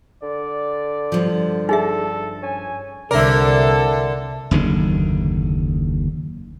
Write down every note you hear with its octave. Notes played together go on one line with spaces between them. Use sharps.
D3 D5
G2 F3
D#4 G#4 A4 E5
C#4 G#5
C2 D3 A4 A#4 D5 E5
F#1 D#2 D3